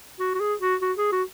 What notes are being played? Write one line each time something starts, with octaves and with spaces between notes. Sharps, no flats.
F#4
F#4
G#4
F#4
F#4
G#4
F#4